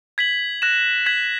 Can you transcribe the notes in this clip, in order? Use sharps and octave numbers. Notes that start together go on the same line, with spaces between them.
G#6 B6 F#7
F#6 A#6 E7
G#6 B6 F#7